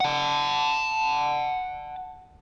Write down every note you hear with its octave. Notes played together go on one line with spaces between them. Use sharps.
F#5 A5